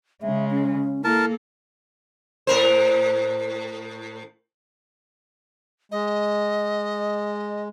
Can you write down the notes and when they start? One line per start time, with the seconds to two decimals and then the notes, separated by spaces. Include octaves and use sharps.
0.22 C#3 G#3 E5
0.51 C#4
1.04 A#3 E4 A4 A#4 A5
2.47 A2 A#4 C5
5.92 G#3 D#5